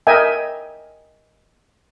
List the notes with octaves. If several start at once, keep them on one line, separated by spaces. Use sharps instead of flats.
A#4 D#5 E5 G5 G#5